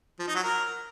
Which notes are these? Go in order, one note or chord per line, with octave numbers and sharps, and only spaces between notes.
F3
D#4
F#3
A#4